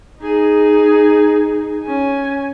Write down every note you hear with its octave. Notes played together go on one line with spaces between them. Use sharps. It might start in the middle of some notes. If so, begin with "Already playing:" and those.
D#4 G#4
C#4 G#5